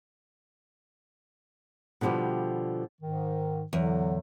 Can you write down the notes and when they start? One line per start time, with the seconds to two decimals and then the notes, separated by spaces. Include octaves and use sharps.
2.01 B2 D3 F3 G3 G4
3.01 G#2 D#3
3.73 E2 A2 D3 F#3